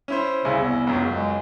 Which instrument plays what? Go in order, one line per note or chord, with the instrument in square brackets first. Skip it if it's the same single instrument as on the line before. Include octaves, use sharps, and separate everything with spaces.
[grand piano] C#4 E4 C5
[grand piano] C2 E4 G#5 [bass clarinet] C#3
[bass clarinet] E2
[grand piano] C#2 F#2
[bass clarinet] G#3